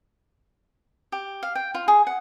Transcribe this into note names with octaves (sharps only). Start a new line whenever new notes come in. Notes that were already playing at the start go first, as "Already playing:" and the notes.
G4
F5
G5
F4
G#4
F#5